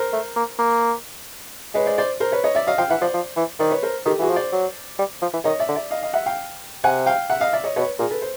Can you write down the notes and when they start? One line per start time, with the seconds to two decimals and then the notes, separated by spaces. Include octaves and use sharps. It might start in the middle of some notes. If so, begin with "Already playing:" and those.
Already playing: A#4 C5
0.13 A3
0.36 A#3
0.59 A#3
1.74 G#3 B4 C#5
1.86 C5 D5
1.98 C5 D5
2.20 A#4 C5
2.32 B4 C#5
2.44 C#5 D#5
2.55 D5 E5
2.67 F#3 D#5 F5
2.78 F3 F5 G5
2.90 E3 E5 F#5
3.01 F3 C5 D5
3.14 F3
3.37 E3
3.59 D#3 C5 D5
3.71 B4 C#5
3.83 A#4 C5
4.05 D#3 G4 A4
4.19 E3 F#4 G#4
4.29 F3
4.36 C5 D5
4.52 F#3
4.99 G3
5.22 F3
5.33 E3
5.44 D#3 C#5 D#5
5.60 D5 E5
5.68 D3
5.76 D5 E5
5.91 D#5 F5
6.02 D#5 F5
6.13 E5 F#5
6.26 F5 G5
6.84 C3 F#5 G#5
7.06 F5 G5
7.30 E5 F#5
7.41 D#5 F5
7.53 D5 E5
7.64 C#5 D#5
7.76 B2 B4 C#5
7.99 A#2 G#4 A#4
8.11 A4 B4
8.22 C5